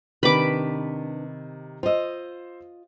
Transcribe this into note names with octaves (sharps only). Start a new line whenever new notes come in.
C3 D#3 D4 B4 B5 D6
F4 C5 D#5 E6